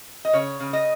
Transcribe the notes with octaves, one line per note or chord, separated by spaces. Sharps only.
D#5
C#3 C#5
C#3
D#5